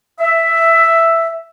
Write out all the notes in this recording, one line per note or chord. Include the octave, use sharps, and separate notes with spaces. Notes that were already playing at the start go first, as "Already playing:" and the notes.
E5